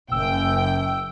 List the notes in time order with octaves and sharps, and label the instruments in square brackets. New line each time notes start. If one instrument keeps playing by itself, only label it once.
[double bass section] F#1 [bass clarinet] F#2 [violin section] G5 [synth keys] E6